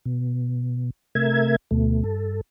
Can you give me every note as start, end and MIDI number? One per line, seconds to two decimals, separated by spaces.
0.05 0.90 47
1.15 1.56 48
1.15 1.56 57
1.15 1.56 70
1.15 1.56 76
1.15 1.56 92
1.71 2.03 38
1.71 2.03 47
1.71 2.03 57
2.04 2.41 43
2.04 2.41 69